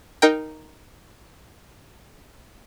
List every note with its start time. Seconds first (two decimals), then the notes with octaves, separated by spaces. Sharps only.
0.22 D#4 A#4 G5